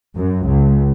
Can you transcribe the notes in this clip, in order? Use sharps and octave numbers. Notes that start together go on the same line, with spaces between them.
F#2
C#2